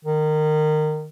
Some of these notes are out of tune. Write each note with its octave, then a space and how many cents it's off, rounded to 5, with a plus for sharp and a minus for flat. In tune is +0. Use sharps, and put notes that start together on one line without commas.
D#3 -25